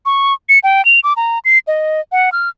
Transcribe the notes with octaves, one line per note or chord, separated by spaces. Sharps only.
C#6
C#7
G5
F7
D6
A#5
C7
D#5
F#5
F6